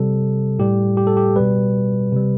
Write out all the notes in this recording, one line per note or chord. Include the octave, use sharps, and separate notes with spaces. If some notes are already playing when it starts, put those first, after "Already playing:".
Already playing: C3 G3 A4
A2 G3 G4
G4
A4
G4
B2 G3 B4
C3 G3